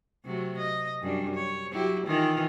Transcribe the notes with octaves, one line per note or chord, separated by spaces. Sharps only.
C3 F#3 A3
D#5
F#2 G3 D4
C#5
F#3 E4 G4
D#3 E3 F4